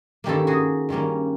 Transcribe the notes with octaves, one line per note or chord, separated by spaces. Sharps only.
G2 D#3 G3 A#3 C#4 G4 A4
F#4 G#4
G2 D#3 G3 A#3 C#4